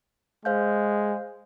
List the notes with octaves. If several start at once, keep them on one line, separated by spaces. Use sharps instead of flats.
G#3 C5 F5 G6